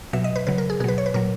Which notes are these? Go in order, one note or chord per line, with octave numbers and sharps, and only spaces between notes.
B2 F#3 E5
D#5
B4
C#3 F#3 B4
A#4
G#4
B2 F#3 G#4 B4
C#5
B4
A#2 F#3 A#4